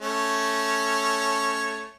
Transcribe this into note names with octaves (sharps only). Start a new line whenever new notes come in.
A3 C#4 C#5